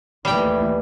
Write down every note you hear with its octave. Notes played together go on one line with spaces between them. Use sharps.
D#2 E3 G3 A3 G5